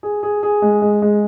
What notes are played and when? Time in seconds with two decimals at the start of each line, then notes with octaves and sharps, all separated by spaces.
0.03 G#4
0.23 G#4
0.43 G#4
0.62 G#3
0.82 G#3
1.02 G#3